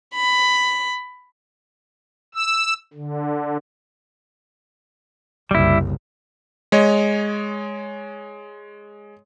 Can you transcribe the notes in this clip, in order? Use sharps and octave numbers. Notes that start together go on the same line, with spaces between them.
B5
E6
D3
F#1 C2 G3 E4
G#3 C#5 D#5